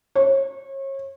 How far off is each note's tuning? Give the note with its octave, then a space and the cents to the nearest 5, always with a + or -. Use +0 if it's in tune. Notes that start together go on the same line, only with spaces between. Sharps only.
C#5 -35